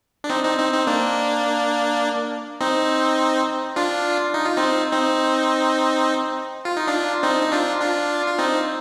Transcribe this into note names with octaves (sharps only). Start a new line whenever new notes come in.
D4
C4 D#4
C4 D#4
C4 D#4
C4 D#4
A#3 D4
C4 D#4
D4 F4
D#4
F4
C4 D#4
C4 D#4
F4
D#4
D4 F4
C4 D#4
D#4
D4 F4
D4 F4
F4
C4 D#4